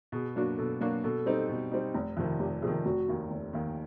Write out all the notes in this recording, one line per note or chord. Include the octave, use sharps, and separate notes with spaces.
B2 G#4
F#3 A#3 D4 F#4
B2 A4
F#3 A#3 D4 F#4
B2 A4
G3 C4 D#4
B2
G3 C4 D#4
F1
F2 C3 D#3
F1 G4
F2 C3 D#3 G#4
F1 F#4
D#2 D#3
F1
D#2 D#3